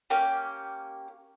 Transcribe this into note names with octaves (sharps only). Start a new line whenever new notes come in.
A#3 C#4 G4